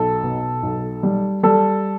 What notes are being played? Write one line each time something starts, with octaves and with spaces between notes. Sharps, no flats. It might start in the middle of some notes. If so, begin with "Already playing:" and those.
Already playing: B1 A4
B2
B1
G3
G3 A4